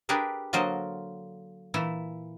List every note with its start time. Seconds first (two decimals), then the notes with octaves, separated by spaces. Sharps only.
0.09 D4 G4 G#4 A#4 B4
0.53 D3 F#3 A#3 A#4 C5 D#5
1.74 A#2 E3 E4